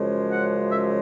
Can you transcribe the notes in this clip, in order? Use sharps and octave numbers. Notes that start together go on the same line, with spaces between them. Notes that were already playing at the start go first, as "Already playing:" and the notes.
Already playing: F#2 C#3 F3 G#3
F#5
E5